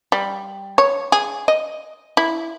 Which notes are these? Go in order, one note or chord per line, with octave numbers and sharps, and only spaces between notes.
G3
C#5
G#4
D#5
E4